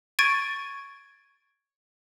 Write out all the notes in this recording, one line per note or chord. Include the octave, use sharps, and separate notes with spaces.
C#6 G#6 A6 D7 D#7